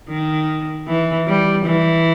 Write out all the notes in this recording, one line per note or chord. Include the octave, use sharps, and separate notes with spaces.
D#3
E3
G3
E3